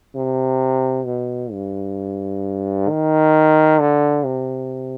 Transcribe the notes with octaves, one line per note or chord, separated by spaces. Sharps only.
C3
B2
G2
D#3
D3
C3